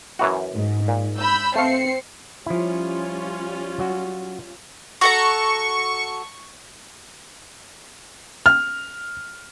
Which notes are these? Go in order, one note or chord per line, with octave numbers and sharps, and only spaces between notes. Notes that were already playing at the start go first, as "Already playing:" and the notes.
F#2 E3 F#4
G#2
A#2
B5 E6 G6
A3 C4 F5 C7 C#7
F3 G3 C#4 E4 F4
F#3 F#4
F#4 A4 A#5 C#6
F6